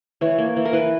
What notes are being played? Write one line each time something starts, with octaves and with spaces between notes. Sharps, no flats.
E3 C#5
A#3
E3
A#4
E3 B4